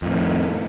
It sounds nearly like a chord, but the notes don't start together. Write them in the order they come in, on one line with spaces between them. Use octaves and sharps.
F2 A2 D#3